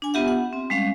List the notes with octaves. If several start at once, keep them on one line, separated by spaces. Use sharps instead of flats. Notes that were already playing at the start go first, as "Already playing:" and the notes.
D4 G#5
B3 F4 G4 E5 F#5
F#5
C4
G3 G#3 C#4 F5